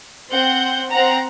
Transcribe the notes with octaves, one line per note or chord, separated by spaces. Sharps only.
C4 F#5 G6
C4 F#5 A#5